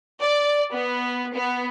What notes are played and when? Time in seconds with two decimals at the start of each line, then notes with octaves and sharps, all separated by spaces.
0.21 D5
0.72 B3
1.34 B3